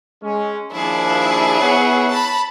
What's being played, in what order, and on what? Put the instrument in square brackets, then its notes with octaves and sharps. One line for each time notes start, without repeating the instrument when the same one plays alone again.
[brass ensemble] G#3 C#4
[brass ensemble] D#2 F3 D4 [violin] E4 G#4
[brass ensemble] B3 C#5 F#5
[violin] A5 B5